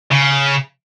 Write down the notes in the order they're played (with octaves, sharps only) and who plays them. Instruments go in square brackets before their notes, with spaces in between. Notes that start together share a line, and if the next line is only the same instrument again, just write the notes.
[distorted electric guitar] C#3